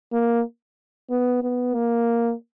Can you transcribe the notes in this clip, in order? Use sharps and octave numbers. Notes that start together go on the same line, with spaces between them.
A#3
B3
B3
A#3